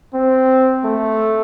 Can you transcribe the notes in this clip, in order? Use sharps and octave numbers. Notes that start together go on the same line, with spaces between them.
C4
A3